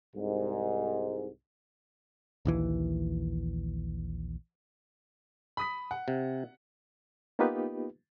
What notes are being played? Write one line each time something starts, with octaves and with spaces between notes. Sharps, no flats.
C2 G#2
A#1 D#2 E3
B5 D#6 B6
F#5
C3
A#3 B3 D#4 F4 G4 B4